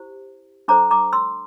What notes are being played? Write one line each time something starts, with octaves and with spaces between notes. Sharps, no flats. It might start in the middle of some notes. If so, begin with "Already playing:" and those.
Already playing: E4 G4 C5
D4 A4 C5 A#5 D6
A#5 D6
C6 E6